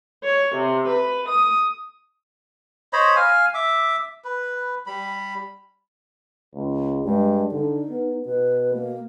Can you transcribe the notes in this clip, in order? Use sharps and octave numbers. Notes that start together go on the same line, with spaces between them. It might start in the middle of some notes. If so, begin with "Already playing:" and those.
C#5
C3
B4
D#6
C5 C#5 D#5 B5
F5 G#5
E5 D6
B4
G3 B5
C#2
G2 G#3
D3 D#4
B3
B2 B4
A#3